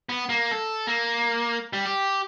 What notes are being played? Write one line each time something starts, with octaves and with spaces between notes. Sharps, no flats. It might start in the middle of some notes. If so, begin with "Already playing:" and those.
B3
A#3
A4
A#3
G3
G4